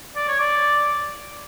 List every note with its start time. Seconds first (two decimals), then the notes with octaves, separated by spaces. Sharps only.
0.16 D5
0.28 C#5
0.39 D5